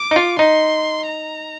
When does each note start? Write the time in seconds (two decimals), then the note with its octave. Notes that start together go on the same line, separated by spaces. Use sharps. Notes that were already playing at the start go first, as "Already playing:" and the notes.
Already playing: D6
0.11 D#4
0.16 F4
0.39 D#4 C6
1.07 A#5